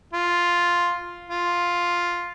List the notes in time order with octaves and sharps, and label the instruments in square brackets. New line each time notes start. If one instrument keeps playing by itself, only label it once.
[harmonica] F4
F4